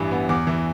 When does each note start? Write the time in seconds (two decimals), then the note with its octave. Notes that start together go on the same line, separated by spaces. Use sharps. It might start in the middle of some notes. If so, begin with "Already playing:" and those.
Already playing: A1 G2 E3
0.11 B3
0.29 E2 D6
0.47 E3